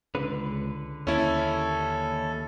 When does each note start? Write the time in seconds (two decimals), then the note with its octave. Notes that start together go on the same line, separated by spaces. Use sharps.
0.15 C#2 D3 B4
1.07 D#2 C#4 E4 A4